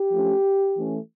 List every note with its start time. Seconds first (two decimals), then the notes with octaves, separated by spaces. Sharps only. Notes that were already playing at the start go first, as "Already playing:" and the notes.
Already playing: G4
0.11 F3 A3 C#4
0.76 E3 A3 C#4